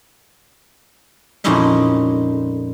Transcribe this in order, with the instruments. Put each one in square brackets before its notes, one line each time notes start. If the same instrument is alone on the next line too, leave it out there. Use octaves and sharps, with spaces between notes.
[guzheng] F2 A#2 G#3 C#4 D#4 E4